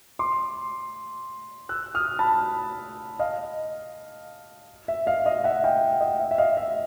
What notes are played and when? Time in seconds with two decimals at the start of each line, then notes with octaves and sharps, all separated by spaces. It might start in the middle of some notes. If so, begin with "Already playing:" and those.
0.19 C6 D6
1.69 E6 F#6
1.95 D#6 F6
2.19 A5 B5
3.20 D#5 F5
4.88 E5
5.06 D#5 F5
5.25 D#5 F5
5.44 E5 F#5
5.64 F5 G5
6.01 D#5
6.19 E5
6.31 E5
6.38 D#5 F5
6.57 E5